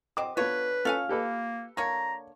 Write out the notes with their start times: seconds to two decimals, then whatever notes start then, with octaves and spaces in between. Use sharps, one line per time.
0.17 F#3 C4 D#5 D6
0.37 D3 B3 F4 B4 C#5
0.85 C#4 F4 A4 F5 G#5
1.09 A#3 G4 A4 B4
1.77 D3 A#3 C#5 A#5 C#6